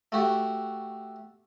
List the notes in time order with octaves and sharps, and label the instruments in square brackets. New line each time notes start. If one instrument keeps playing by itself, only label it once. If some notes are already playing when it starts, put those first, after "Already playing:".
[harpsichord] A3 F#4 G4